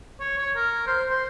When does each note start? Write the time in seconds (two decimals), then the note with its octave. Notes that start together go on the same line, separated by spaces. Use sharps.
0.20 C#5
0.38 C#5
0.56 A#4
0.87 C5
1.10 C5